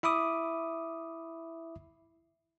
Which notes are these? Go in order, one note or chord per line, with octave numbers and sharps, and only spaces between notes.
E4 E5 B5 D6 D#6